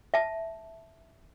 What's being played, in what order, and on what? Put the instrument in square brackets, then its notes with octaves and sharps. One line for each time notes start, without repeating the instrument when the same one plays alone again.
[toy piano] E5 A5